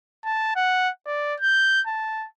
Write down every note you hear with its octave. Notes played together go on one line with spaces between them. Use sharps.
A5
F#5
D5
G6
A5